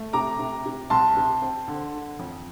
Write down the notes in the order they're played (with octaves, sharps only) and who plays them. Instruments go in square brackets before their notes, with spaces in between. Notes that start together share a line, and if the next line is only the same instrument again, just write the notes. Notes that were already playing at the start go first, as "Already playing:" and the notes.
Already playing: [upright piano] A3
C3 A#5 D6
C3
C3
C2 A5 C6
C3
C4
D3
D3
F2